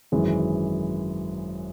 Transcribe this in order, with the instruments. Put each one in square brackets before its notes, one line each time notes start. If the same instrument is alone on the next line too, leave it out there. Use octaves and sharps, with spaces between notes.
[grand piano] G#1 F#2 E3 G#3